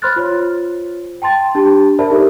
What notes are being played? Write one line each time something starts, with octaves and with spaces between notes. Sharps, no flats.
C5 B5 C6 F6 F#6 A6
F4 C5 C#5
G5 A5 C6 A6
D4 G4 A5
A#4 C5 D5 E5 A5 B5
D#4 G4 A4 A#4 D5 E5